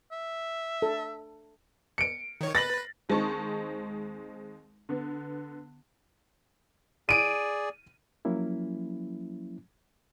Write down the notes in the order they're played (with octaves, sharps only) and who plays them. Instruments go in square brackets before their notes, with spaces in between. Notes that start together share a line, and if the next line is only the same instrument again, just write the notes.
[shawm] E5
[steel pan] A4
[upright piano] C#7 D7
[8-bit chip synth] D#3 C#5
[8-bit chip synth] B4 [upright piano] A6 A#6 F#7
[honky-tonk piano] D#2 G#3 C4 D#4 A5 C#6
D3 B3
[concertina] G#4 D5 [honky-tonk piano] D7 D#7
[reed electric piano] F3 F#3 A#3 C#4 E4